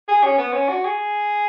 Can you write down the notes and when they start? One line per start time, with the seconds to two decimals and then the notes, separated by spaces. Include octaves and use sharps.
0.08 G#4
0.23 C#4
0.38 B3
0.53 C#4
0.69 F#4
0.85 G#4